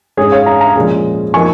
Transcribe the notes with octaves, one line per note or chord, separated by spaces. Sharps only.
G#2 G#3 C#4 G#4 C#5
C#5 F5
F5 A#5
F5 A#5
A#2 F3 G#3 C#4
F3 A#3 D#4 G#5 C#6